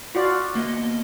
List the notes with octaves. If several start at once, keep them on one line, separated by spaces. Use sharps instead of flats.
F4 F#4 D5
A#3 B3 D#5